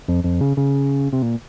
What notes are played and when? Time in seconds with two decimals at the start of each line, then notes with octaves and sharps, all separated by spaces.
0.08 F2
0.24 F2
0.41 C#3
0.57 C#3
1.13 C3
1.22 A#2